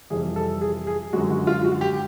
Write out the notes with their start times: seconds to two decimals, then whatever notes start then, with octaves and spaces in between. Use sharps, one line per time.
0.10 F2 C3 E3 G3 G#4
0.36 A4
0.61 G#4
0.87 G#4
1.13 F#2 D3 F3 G#3 F#4
1.30 F#4
1.47 F4
1.65 F#4
1.81 G4